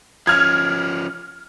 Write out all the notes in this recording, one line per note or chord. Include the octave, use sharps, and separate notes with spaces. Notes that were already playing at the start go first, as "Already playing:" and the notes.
F3 C#4 F6 G#6